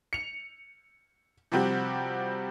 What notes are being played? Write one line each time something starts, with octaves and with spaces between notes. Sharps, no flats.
C#7 F7
C3 F3 G3 C4 F#4 G4